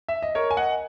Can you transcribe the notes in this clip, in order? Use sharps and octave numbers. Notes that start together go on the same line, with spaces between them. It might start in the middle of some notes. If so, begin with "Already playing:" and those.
E5
D#5
A#4 C#5
G#5
D#5 F#5